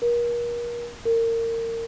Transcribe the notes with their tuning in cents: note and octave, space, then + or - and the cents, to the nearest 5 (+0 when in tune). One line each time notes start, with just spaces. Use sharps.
A#4 +35
A#4 -25